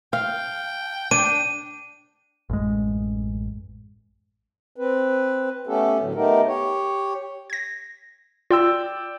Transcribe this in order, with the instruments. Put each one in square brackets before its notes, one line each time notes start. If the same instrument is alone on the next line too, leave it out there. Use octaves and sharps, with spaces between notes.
[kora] F5 [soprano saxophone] G5
[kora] D4 [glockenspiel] D#7
[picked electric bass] A1 F#2 G#3
[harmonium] C4 B4
A3 B3 C#4 G4 A4
A2 D3 F#3
A3 B3 D#4 G4 A#4
G4 C#5
[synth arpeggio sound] G#6 A#6
[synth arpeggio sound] F4 [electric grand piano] D5 G5 E6